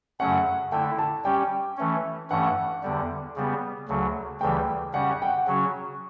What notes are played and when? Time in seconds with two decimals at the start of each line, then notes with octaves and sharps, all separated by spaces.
0.20 F#2 C#3 F#3 A3 C#4 F#5
0.72 D3 A3 E4 G5
0.99 A5
1.24 G3 C#4 G4 G5
1.77 E3 A3 C#4
2.30 G2 E3 A3 C#4 F#5
2.83 E2 D3 G3
3.36 C#3 G3 B3
3.88 D2 C#3 F#3
4.41 D2 C#3 E3 G3 G5
4.93 C#3 G3 C#4 F#5
5.11 F#5
5.22 G5
5.28 F#5
5.47 C#3 F#3 C#4 F#4